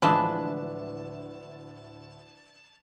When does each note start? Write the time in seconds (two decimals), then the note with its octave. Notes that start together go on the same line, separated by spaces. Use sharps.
0.02 D2 A2 E3 F3 G#3 D4 B4 A5